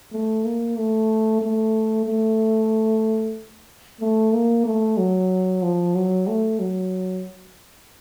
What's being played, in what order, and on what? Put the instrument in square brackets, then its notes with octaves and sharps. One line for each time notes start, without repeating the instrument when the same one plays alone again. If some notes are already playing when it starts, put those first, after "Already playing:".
[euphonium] A3
A#3
A3
A3
A3
A3
A#3
A3
F#3
F3
F#3
A3
F#3